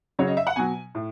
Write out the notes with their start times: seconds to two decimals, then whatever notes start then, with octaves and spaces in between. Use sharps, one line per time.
0.19 C#3 F#3 C#5
0.28 D#5
0.37 E5
0.47 F#5
0.56 B2 F#3 G#5
0.95 A2